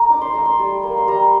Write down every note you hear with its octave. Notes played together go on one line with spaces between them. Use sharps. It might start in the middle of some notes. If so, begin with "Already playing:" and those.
Already playing: A3 A#5
D#4 D6
C6
A3 A#5
C6
G3
A#3
C6
G3 A#5